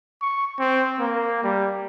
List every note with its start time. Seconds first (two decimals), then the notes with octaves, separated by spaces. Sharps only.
0.22 C#6
0.59 C4
0.99 A#3
1.44 G3